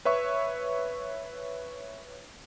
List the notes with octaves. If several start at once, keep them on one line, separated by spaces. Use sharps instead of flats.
B4 C#5 E5 C#6